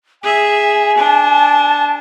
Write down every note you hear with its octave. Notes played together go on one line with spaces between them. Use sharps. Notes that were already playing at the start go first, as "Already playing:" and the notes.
G#4 E5 G#5
D4 A5